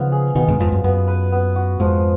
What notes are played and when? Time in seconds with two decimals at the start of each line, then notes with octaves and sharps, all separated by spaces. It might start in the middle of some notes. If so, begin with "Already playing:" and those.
Already playing: C#3 F3 B3 D#4 F5
0.12 G#4
0.35 B2 D#3 B3
0.48 G#2 B2
0.60 F2 G#2 F4
0.72 F#2
0.84 F#2 B3
1.08 B4
1.32 B3
1.56 F#4
1.80 F2 G#2 F3